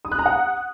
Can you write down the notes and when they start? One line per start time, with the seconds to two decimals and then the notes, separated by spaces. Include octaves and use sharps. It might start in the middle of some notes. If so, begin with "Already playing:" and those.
0.05 D#6
0.12 F#6
0.19 A#5
0.26 F#5